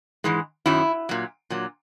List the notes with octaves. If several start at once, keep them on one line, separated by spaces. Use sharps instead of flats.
G#2 E3 G#3
F#2 D#3 F#3 E4
A#2 F#3
A#2 F#3